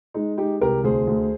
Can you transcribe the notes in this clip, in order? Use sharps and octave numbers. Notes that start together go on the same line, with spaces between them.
G#3 D#4
G#3 D#4 G4
C2 G4 A#4
D2 G#4 C5
D2